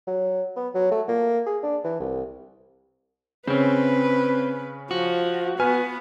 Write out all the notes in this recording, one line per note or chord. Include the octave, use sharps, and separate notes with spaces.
F#3
B3
F#3
A3
A#3
G#4
D4
E3
C2
C#3 C4 C#4 B4
F3 F#4
B3 B4 G#5 F6